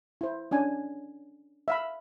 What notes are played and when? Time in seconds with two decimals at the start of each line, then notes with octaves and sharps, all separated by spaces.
0.21 E4 C5
0.51 C#4 D4 G#5
1.68 E5 F5 B5